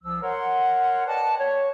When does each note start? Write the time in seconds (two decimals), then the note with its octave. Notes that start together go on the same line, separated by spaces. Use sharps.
0.03 C2 F3 E6
0.22 A#4 C#5 F#5 C6
1.07 B4 D5 D#5 F#5 G5 A5
1.40 C#5